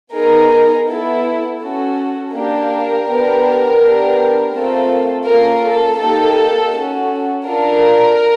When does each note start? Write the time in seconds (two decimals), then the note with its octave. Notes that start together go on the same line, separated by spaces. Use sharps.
0.13 B3 D#4 G#4 A#4
0.87 B3 E4 A4
1.60 C#4 F#4 A4
2.33 A#3 D4 G4 A#4
3.06 B3 D4 G4
3.80 B3 D4 G4
4.53 A3 C4 F4 A4
5.26 A#3 C#4 F4 A4 A#4
5.63 A4
5.99 A#3 D#4 G4 A4
6.72 C#4 F#4 A4
7.46 D4 F4 A4 A#4